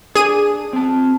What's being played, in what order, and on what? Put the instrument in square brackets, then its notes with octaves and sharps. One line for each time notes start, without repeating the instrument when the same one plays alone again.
[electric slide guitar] D4 [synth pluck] G#4 D#7
[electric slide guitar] C4 A5